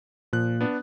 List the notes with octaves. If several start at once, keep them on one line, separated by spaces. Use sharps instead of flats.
A#2 F3 F#6
B3 D4